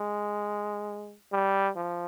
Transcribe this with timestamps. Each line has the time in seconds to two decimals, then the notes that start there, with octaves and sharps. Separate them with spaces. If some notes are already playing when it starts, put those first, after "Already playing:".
Already playing: G#3
1.32 G3
1.76 F3